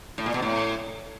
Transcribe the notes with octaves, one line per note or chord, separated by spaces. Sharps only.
A2
A#2
B2
A2